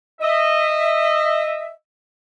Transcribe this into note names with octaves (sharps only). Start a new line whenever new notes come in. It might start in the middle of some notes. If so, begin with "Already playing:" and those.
D#5 E5